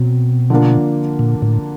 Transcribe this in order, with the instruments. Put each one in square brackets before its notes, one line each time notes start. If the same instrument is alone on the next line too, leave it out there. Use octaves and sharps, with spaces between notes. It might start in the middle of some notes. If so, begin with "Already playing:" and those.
Already playing: [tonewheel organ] B2 [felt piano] F#3 C4
[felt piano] D3 F3 A#3 D4
[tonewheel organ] A#2
A2